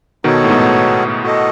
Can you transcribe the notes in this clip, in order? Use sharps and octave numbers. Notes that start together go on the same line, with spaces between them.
B2 D#3 B3 D#4 F#4 A4 C#5
A2
G#2 B2
F#4 A4 D#5